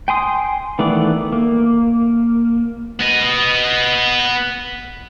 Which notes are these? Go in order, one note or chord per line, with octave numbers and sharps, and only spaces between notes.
G5 G#5 C6 D#6
D#3 E3 A3 B3 D5
A#3
B3 D#5